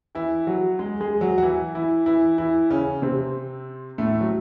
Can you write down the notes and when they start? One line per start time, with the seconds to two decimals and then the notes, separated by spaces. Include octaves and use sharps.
0.15 E3 E4
0.47 F#3 F#4
0.79 G#3 G#4
1.00 G#3 G#4
1.21 F#3 F#4
1.38 F#4
1.43 E3 E4
1.75 E3 E4
2.06 E3 E4
2.38 E3 E4
2.70 C#3 C#4
3.02 C3 C4
3.98 A2 A3
4.21 F#3